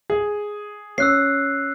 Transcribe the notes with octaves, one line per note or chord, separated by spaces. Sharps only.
G#4
C#4 E6 F#6 C7